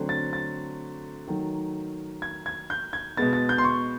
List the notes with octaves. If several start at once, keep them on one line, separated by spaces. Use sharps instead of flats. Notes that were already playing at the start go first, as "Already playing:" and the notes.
Already playing: D3 F#3 A3 C4
A6
A6
D#3 F#3 A3
G#6
G#6
G6
G#6
B2 G#3 B3 A6
A6
G6
C6
C#6